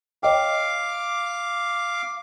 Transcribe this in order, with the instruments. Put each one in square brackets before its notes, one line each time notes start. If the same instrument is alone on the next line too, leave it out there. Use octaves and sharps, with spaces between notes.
[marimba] C#5 D#5 G5 [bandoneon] F5 D6